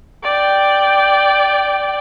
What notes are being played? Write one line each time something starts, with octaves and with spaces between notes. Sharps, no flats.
D5 G5